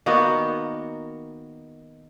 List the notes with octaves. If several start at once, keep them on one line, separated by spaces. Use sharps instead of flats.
D#3 A#3 B3 F#4